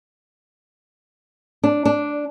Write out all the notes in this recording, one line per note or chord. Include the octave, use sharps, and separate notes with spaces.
D4
D4